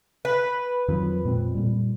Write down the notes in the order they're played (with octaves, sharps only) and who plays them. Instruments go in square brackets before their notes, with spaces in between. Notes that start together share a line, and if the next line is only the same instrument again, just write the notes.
[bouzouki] B4
[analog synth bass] F2 [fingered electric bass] D#3 F#3
[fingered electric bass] A#2 G#3 C4
A#2 G3